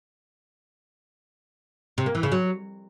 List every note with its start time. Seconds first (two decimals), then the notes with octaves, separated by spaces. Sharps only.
1.98 C3
2.06 A#3
2.15 E3
2.23 C#3
2.32 F#3